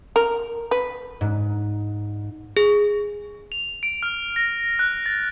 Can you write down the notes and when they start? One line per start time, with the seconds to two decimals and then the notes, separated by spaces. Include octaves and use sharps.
0.16 A#4
0.71 B4
1.21 G#2
2.57 G#4
3.52 F7
3.83 D7
4.03 F6
4.36 A#6
4.79 F#6
5.06 A6